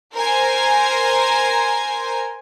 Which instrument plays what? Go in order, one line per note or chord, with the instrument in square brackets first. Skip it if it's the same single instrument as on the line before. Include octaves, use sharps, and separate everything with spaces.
[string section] A#4 C5 G#5